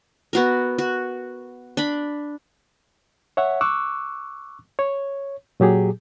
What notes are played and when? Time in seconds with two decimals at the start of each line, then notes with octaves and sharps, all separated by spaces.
0.33 B3 F#4 A#4
0.78 F#4
1.77 D4 B5
3.37 C#5 E5 F#5
3.61 C#6 D6 E6 F#6
4.79 C#5
5.60 A#2 F#3 G4 G#4